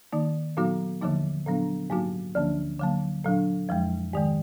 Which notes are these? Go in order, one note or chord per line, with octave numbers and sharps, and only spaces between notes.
D#3 A#3 D#4
A#2 F#3 B3 D#4 F#4
D#2 D3 F3 A#3 D#4
A#2 F#3 B3 D4
G#2 F#3 A#3 D#4 F#4
D2 D3 F3 A#3 D4
D3 F#3 A#3
A#2 F#3 D4
F2 F3 G#3
G#2 D#3 G#3